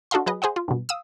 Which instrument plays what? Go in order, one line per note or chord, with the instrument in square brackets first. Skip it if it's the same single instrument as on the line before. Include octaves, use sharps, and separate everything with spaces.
[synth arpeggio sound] D4 F#4 A4 D#5 F5 C6
F#3 G#4 B4 D#5
G#4 C5 D#5 F#5
F4
G2 B2
F5 D#6 E6